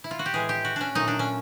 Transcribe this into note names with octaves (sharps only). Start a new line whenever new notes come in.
E4
F4
F#4
G4
A2 E3 G#3 G#4
G4
F#4
C#4 D4
A#2 F#3 A3 D#4
D4
C#4